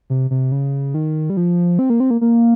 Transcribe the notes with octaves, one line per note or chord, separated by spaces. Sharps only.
C3
C3
C#3
D#3
G3
F3
C4
A#3
C4
A#3
A#3